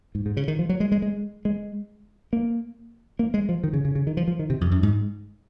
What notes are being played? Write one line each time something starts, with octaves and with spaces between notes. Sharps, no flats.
G#2
G#2
C#3
D#3
F3
F#3
G#3
G#3
G#3
G#3
A#3
A#3
G#3
F3
D#3
C#3
C#3
C#3
D#3
F3
F3
D#3
C3
F2
F#2
G#2